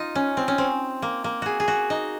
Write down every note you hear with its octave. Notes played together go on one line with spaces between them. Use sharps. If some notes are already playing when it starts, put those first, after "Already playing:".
Already playing: D#4 F4
C#4
C4
C#4
C4
A#3
A#3
F#4 G#4
G#4
F#4
D#4